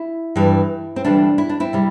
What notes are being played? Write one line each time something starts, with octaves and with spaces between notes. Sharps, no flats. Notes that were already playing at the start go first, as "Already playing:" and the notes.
Already playing: E4
G2 E3 G3
C4
D2 C3 E3 G3 D4
E4
D4
C4 E4
C3 G3